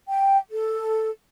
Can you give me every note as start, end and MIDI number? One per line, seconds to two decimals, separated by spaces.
0.08 0.37 79
0.51 1.08 69